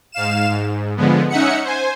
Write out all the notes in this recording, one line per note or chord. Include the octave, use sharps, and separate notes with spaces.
G#2 F5 E7
G#2
D3 F3 G#3 B3
C#4 D#4 E5 F#5 C#7
C5 G#5